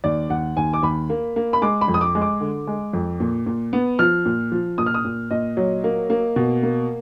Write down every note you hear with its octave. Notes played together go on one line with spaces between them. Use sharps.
D#2 D5
D#2 F#5
D#2 G#5
D6
D#2 B5
A#3
A#3
B5
G#3 D6
B5
F2
D#6
D6
G#3
D6
D3
G#3
F2
A#2
A#2
B3
F3 F6
A#2
F3
A#2 D#6
F6
D#6
A#2
A#2 D#5
F#3
A#3
A#3
B2
A#3